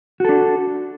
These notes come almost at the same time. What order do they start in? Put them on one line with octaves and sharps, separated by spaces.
F#4 A4 D4